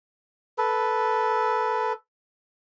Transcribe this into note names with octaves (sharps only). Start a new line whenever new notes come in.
A4 B4